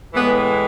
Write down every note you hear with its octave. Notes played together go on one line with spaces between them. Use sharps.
A2 E3 G#3 B3